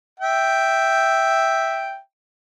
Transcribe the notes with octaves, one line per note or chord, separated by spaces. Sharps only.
E5 G5